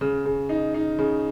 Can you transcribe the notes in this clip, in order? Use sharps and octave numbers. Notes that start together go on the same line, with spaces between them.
C#3
C#3
D#4
D#4
C#3